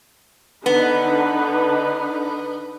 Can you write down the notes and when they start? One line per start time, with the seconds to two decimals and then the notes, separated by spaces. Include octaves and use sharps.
0.66 D3 B3 D#4 B4